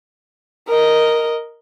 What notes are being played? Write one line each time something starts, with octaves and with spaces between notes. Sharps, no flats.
A#4 D#5